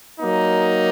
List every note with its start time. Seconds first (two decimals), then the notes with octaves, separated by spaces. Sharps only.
0.20 F#3 A#3 D#4